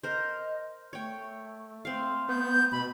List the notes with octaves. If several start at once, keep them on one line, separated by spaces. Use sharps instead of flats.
A#4 C5 D#5
A3 C#5 G5
C4 F5
B3 G6
B2 B5